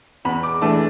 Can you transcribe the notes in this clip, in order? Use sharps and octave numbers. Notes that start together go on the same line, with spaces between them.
E2 B5
D6
E3 A3 D4 A5